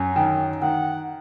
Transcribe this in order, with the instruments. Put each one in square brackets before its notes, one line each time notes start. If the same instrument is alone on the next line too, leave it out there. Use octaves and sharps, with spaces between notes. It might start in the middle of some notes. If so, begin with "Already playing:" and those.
Already playing: [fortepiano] F#2 [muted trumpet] G#5
[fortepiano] D#3
[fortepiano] D#3 [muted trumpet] F#5